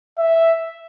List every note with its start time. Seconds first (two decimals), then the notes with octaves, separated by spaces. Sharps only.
0.18 E5